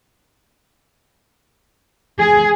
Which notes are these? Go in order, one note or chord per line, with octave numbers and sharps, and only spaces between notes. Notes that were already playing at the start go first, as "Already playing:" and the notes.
G#4